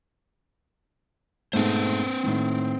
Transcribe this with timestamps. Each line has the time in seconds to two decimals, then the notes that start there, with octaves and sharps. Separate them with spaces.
1.53 G#2 B2 A3 C4 B4 C5
2.23 A2 D#3